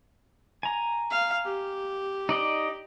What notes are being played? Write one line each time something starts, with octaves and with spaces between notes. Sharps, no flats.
G#5 A#5
F5
G4
D#4 D5 D#5